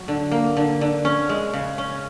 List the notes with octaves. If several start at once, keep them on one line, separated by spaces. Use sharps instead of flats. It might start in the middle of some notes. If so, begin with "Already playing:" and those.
Already playing: F#3
D3
A#3
D3
D3
C#4
G#3
C#3
C#4